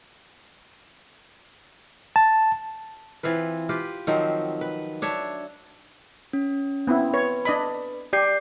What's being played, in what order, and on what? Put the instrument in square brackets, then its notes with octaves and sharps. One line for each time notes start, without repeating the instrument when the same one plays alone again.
[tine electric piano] A5
[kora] E3 C4 F4 B4
F4 G4 B4
D#3 F3 F#3 C4
B4
D4 C#5 E5
[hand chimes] C#4
[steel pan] B3 C4 E4
[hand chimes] B4 [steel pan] C#5
[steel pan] D4 D#5 B5
[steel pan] G4 [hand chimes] D5 G6 C7